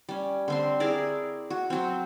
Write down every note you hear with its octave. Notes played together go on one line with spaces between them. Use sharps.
G3 C#4
D3 C4 C6
E4 G#4 A#4 D5
F#4
F#3 C4